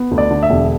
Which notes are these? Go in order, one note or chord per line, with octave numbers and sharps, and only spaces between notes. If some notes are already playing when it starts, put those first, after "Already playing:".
Already playing: B3
D2
D5
D3
E5
E1